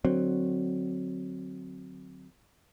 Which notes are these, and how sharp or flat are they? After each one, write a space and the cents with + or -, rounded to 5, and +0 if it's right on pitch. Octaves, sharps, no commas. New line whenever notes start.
D3 +25 F#3 +0 C4 +0